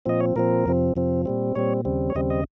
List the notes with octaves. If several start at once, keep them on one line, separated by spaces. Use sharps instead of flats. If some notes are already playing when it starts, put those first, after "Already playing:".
A#2 F3 C4 D#5
C#5
A#2 F3 C4 A#4
F2 C3 F3 C4
F2 C3 F3 C4
A#2 G3 C4
A#2 G3 C4 C#5
D#2 C#3 G3 C4
C#5
D#2 C#3 G3 C4 D#5
D#5